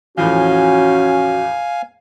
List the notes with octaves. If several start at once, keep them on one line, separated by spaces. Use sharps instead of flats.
E2 A2 F3 C#4 F#4 F5 G#5